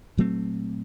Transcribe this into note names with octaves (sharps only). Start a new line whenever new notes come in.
A#2 F#3 A3 C4